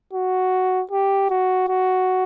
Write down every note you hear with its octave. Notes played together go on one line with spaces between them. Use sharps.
F#4
G4
F#4
F#4